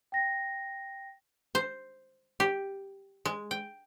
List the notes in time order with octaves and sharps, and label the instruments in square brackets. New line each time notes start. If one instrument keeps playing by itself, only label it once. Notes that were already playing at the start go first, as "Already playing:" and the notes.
[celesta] G5 A#6
[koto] C5
G4
G#3
G5